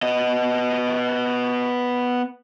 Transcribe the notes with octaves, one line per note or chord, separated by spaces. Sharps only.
B3 D#5